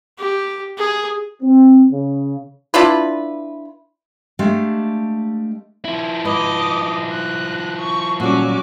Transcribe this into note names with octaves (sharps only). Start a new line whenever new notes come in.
G4
G#4
C4
C#3
D4 E4 F4 B4
G#3 A3 D4 G4 F5
F3 E4
G#2 B4 D#5 D6
F#6
C#6
A#2 F#3 G3 C#4 F#4 D6